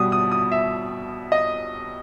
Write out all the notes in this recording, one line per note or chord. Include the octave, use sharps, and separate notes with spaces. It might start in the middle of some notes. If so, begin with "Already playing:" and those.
Already playing: B2 G3 B3 D#6
D#6
D#6
E5
D#5